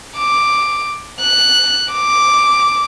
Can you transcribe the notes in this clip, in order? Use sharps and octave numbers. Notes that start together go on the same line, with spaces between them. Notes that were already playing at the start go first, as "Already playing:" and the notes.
D6
F#6
D6